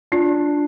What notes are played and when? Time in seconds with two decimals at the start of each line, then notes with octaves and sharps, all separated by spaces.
0.12 D4 F4